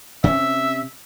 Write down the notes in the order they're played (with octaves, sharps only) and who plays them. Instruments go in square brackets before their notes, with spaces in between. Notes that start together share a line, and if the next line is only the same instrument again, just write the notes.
[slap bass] C3 C#4 [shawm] E5